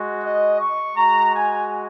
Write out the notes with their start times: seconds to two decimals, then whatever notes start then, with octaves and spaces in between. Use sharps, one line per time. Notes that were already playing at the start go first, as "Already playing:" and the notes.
Already playing: G#3 F#4
0.22 D#5
0.58 C#6
0.95 G#3 F#4 A#5
1.33 G#5